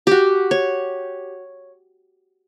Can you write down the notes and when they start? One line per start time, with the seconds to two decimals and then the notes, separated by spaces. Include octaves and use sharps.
0.07 F#4 G4
0.51 C#5